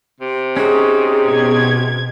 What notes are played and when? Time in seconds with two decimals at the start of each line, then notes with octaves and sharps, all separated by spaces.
0.20 C3
0.57 C#4 D#4 F#4 G#4
1.26 B2 G#6